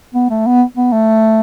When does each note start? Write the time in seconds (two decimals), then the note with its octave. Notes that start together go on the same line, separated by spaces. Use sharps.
0.14 B3
0.30 A3
0.46 B3
0.77 B3
0.92 A3